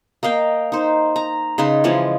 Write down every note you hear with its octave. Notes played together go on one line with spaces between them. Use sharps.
A#3 D#5 F5 G5
D#4 C5
A#5
C#3 D#4 B4 C6
E3 F3 G#3 C#4